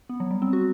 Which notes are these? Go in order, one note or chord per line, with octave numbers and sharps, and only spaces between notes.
B3
F#3
G3
C4
F#4